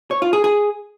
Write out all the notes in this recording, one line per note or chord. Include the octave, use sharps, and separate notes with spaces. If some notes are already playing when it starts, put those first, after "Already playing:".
C#5
F4
G#4
G#4